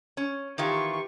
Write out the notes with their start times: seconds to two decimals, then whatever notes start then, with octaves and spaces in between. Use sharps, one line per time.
0.17 C#4
0.58 D#3 E3 F4 G4 C#6